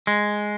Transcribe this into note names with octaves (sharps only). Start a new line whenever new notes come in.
G#3